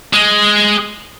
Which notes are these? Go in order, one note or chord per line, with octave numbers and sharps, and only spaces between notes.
G#3